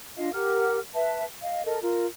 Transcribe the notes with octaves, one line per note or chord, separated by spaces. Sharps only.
D4 F4 D#5 F5
G4 A#4 F#5 F6
B4 E5 A5
D#5 F5
A4 A#4 D#5
F4 A#4